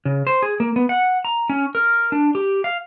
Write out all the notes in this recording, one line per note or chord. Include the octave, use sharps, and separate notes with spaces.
C#3
C5
G#4
A#3
B3
F#5
A#5
C#4
A#4
D4
G4
F5